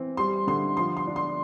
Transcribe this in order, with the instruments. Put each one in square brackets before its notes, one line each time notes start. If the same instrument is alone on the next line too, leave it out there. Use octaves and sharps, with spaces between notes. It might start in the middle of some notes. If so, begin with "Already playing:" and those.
Already playing: [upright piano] E3 C4
G3 C6
D3 C6
F3 C6
C6
D4
C6